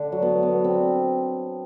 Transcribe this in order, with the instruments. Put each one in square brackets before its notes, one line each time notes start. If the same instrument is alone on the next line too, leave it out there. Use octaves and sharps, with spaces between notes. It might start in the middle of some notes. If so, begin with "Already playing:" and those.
Already playing: [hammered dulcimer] D3
F#3
B3
B3
C4